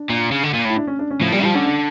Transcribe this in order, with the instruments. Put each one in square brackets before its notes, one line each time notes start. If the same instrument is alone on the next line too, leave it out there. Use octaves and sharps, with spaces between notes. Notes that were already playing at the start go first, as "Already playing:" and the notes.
Already playing: [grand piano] D4
[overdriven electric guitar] A#2
C#3
D3
A#2
[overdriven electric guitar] A2 [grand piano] E4
[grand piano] D4
C#4
D4
C#4
[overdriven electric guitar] A2 [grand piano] F3
[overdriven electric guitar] A#2 [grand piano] G3
[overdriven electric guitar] F3 [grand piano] G3
[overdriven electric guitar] D3 [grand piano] C#4
[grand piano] D4